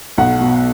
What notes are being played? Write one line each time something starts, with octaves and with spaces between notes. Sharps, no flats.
B1 F#5
B2